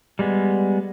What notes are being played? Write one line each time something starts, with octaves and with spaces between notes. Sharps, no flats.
G3 G#3 B3